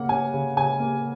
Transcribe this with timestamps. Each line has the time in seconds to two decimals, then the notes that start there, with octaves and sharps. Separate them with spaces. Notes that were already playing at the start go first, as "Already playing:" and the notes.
Already playing: C#3 A#3 F#5
0.09 C#4 G#5
0.34 C#3
0.57 C#3 G#5
0.80 A#3